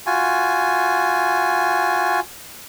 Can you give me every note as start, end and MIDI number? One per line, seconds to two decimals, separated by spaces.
0.06 2.20 65
0.06 2.20 66
0.06 2.20 80